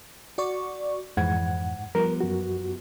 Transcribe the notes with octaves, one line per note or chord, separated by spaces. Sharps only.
F#4 D5 C#6
F2 G#2 E3 F#5 G#6
F3 G3 B3 A#4
F#2 F#4